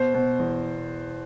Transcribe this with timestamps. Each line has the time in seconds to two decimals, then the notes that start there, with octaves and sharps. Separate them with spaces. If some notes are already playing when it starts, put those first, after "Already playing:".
Already playing: B2 C5
0.14 B2
0.39 E2